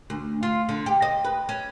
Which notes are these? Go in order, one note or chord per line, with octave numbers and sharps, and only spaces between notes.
D2
F4
D3
G4
D#5
B4
C#4